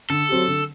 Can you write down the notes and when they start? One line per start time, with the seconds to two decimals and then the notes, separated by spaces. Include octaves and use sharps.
0.10 D3 A4
0.29 F#3 C4 G4
0.48 D3